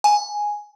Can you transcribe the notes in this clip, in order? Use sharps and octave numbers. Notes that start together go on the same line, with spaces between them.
G#5